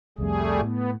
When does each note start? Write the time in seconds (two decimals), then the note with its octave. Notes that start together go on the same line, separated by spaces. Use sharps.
0.18 C2 F2 G3 A3 G#4
0.61 A2 B3